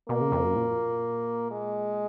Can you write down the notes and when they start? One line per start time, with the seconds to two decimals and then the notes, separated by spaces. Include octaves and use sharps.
0.08 B2 A#3
0.21 C#3
0.32 F2
0.44 F#2
0.56 A#2
1.51 G#3